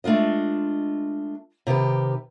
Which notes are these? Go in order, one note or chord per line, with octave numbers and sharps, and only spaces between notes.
G#3 A3 D4 F4 D#5
C3 D#3 G4 B4